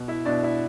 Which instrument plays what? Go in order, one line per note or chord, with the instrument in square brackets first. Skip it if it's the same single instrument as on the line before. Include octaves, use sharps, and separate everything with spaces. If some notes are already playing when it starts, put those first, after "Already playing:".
Already playing: [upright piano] B2
E4 E5
B2 D4 D5
E4 E5